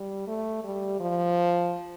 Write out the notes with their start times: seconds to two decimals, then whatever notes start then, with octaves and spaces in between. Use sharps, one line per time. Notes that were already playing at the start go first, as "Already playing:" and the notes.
Already playing: G3
0.27 A3
0.64 G3
1.00 F3